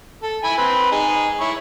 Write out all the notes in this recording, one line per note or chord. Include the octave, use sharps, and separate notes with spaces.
A4
E4 G#5 B5
C4 B4
D#4 G#4
E4 C#5